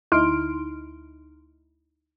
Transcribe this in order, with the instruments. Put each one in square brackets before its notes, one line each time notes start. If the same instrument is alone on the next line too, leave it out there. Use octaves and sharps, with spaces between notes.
[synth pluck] D2 D#4 E4 C6 F6 D7